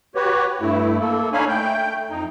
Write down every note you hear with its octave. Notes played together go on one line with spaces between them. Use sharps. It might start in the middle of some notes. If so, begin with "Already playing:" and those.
F#4 G4 B4 C#5
G2 A3 E4
A#3 A4
D4 D#4 C#5 F5 G#5 B5
A3 G5 G6
F2 D#4